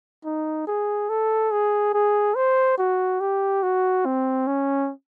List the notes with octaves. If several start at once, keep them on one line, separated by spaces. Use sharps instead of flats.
D#4
G#4
A4
G#4
G#4
C5
F#4
G4
F#4
C4
C#4